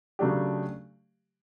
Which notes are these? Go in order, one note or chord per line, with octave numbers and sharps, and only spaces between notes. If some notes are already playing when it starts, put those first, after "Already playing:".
C#3 F#3 A3 D4 G4